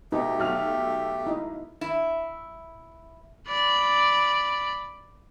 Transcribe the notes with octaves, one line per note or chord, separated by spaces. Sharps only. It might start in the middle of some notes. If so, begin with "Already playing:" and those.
B2 A3 D#4 G4
B1 F#4 F6 F7
D#4 E4 D#5
E4
D5 B5